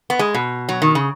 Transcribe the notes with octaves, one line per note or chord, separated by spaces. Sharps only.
B3
G#3
B2
F#3
D#3
C#3